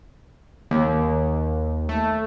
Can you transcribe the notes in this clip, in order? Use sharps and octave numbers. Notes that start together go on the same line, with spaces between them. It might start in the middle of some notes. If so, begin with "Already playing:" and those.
D#2
A3